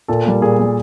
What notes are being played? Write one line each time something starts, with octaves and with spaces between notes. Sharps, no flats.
A#2 A4
G3 A#3
A#2 G#4
G3 A#3